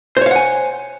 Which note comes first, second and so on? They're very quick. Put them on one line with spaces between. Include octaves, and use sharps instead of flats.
C5 C#5 F5 F#5 G#5